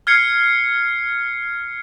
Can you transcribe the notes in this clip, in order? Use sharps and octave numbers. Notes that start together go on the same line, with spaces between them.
F6 G#6 C7 C#7